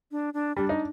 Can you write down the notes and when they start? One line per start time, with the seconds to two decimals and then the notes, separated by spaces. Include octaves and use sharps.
0.11 D4
0.34 D4
0.57 G3 D4
0.69 D#4